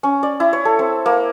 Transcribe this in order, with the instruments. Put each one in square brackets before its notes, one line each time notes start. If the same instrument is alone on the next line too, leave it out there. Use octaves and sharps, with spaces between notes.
[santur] C#4
D5
E4
C#5
A4
C4
A#3